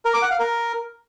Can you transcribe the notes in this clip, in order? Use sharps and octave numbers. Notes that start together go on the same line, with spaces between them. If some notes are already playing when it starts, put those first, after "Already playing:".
A#4
D6
F#5
F5
A#4